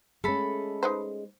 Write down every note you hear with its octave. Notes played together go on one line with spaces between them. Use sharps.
G#3 A3 C#4 A4 B5
D#4 B4 C5